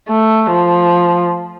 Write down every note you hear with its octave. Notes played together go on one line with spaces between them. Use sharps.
A3
F3